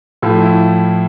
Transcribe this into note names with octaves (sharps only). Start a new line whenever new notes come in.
A2 F3 A3 F4
E4